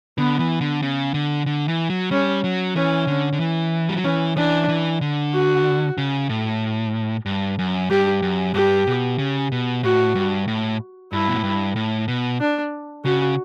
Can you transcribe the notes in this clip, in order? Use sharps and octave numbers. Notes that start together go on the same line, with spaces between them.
D3 B3
E3
D3
C#3
D3
D3
E3
F#3
G3 C#4
F#3
E3 C#4
D3
D3
E3
G3
F#3
E3 C#4
E3 D4
E3
D3
F#4
C#3
A2
G2
F#2
G2 G4
F#2
G2 G4
B2
C#3
B2
A2 F#4
G2
A2
G2 E4
B2
A2
G2
A2
B2
D4
C#3 F#4